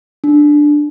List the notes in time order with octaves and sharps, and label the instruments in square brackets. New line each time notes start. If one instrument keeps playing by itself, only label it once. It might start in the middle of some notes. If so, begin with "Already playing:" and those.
[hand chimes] D4